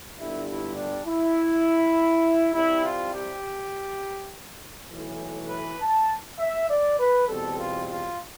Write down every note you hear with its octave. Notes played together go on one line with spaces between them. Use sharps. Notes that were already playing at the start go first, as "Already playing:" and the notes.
G1 G2 D3 G3 E4
E4
D4
E4
C2 C3 G3 E4
F4
G4
B1 A2 E3
B4
A5
E5
D5
B4
E2 B2 G3 C4 A4
F4
F4